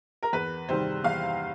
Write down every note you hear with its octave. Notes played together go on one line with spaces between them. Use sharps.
A#4
E2 B4
C3 D#3 G3 C5
E2 F5